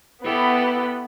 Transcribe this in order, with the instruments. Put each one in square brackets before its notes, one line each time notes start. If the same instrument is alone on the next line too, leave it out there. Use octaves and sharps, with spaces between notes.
[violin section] B3 [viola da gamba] E4 G4 A4